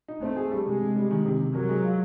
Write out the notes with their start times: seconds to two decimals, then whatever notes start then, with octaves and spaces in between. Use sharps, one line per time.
0.08 D#4
0.22 A3 C4
0.37 G#4
0.52 G3
0.66 C3 G#3
0.81 C3
0.96 G3
1.11 D#3
1.25 C3
1.40 C3
1.55 F#3 A#4
1.69 G#3
1.84 F4